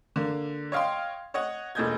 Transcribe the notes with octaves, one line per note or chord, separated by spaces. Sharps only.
D3 A#3
C#5 D#5 F5 G5 C6
C#5 D#5 F#5
E1 A#2 A4 D#5 G6 G#6